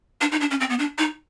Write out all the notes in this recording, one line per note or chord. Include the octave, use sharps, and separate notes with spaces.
D4
D#4
D4
C#4
C4
B3
D4
D#4